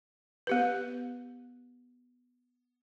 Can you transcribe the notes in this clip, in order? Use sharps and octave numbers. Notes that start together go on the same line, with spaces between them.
B3 G4 B4